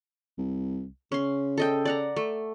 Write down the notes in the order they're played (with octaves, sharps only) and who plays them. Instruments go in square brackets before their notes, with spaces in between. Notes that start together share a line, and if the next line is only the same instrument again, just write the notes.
[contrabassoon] C2
[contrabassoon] C#3 [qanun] C#4 C6
[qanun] A4 D#5 G5
D5 F#5 A#5
A3